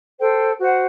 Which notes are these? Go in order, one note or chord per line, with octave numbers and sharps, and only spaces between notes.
A4 C5 G5
F#4 C5 F#5